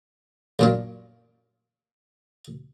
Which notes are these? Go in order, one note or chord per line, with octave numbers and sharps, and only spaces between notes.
F#2 A#2 D4